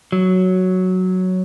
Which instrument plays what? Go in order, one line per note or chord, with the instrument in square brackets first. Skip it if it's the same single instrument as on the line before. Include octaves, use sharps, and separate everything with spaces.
[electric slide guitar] F#3